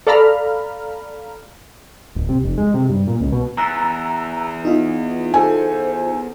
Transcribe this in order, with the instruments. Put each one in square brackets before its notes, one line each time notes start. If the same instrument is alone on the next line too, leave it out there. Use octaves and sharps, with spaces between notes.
[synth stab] A4 D5 F5 A#5 B5 F6
[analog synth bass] D1
C3
F1
G#3
C3
G2
A#2
C#2
B2
[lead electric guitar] E2 [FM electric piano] A#5 E6 F#6
[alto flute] B3 [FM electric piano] D#4 F4
[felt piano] A4 G#5 [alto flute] C5